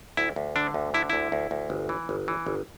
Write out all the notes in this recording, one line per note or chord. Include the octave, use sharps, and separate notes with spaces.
D2 E4
D2
D3 D4
D2
D3 E4
D2 E4
D2
D2
G1
E3
G1
E3
G1